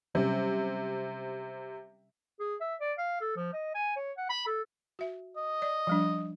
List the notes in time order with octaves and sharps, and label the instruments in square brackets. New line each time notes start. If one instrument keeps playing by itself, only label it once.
[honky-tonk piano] C3 [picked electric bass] F#3 G3 C#4
[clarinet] G#4
E5
D5
F5
A4
F3
D#5
G#5
C#5
F#5
B5
A4
[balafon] F#4 E5
[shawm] D#5
[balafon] D5
F3 G3 D4